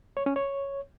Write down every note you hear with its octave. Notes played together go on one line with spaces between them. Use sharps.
C#5
C#4
C#5